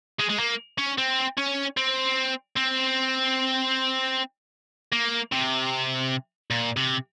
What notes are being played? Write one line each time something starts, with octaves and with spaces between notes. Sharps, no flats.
G#3
G#3
A#3
C#4
C4
C#4
C4
C4
A#3
C3
A#2
C3